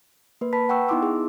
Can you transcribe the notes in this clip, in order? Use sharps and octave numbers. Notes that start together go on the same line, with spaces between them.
A#3 B4
B4 A5 B5 B6
F#5 G5 C#6 E6
B3 D#4 E4 C6 D6 E6
G#4